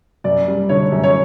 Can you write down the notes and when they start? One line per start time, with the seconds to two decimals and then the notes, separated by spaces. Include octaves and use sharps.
0.24 F#2 D5
0.48 G3
0.69 D3 C#5
0.92 F#2
1.04 C#5